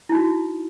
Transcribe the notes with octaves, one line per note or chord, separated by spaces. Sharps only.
D#4 E4 F#4